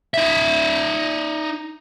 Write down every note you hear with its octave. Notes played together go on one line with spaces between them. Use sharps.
D#4 E5